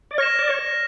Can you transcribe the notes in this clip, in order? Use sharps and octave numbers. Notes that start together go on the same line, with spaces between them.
D5
C#5 F6 A#6 E7
D5
C#5